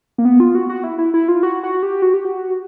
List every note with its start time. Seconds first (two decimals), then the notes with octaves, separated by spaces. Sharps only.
0.18 A#3
0.25 B3
0.40 F4
0.55 F#4
0.69 F#4
0.84 E4
0.98 E4
1.14 E4
1.28 F4
1.43 F#4
1.63 F#4
1.83 G4
2.02 F#4
2.14 G4
2.25 F#4